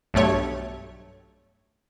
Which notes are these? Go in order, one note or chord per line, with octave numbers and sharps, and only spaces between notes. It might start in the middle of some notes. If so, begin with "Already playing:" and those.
B1 G2 A3 C#5